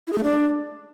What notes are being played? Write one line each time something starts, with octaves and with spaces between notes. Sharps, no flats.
E4
G#4
A3
D4